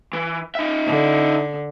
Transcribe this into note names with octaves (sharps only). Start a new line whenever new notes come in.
E3
D#4 E5
D3